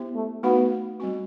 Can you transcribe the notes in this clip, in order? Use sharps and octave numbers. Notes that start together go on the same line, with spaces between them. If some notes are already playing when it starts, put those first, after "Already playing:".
Already playing: B3 E4 G4 C5 E5
A3
A3 B3 D#4 F#4
G3 C4 F#4